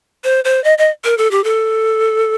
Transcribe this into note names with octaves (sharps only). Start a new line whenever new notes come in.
C5
C5
D#5
D#5
A#4
A4
G4
A4